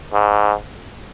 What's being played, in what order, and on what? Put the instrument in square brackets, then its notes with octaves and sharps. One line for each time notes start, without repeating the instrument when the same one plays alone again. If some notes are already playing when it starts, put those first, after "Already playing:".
[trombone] G#2